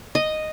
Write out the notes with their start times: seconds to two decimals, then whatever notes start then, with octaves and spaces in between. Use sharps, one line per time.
0.15 D#5